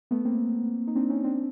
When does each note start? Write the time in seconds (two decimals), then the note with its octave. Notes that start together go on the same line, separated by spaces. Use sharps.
0.11 A3 B3
0.25 A#3 C4
0.87 D#4
0.96 C4 D4
1.10 C#4 D#4
1.24 C4 D4